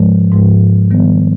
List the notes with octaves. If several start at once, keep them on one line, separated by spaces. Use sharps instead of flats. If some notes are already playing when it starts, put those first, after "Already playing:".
Already playing: G#2 F3 G#3
G#2 F3 G#3
D#3 G3 B3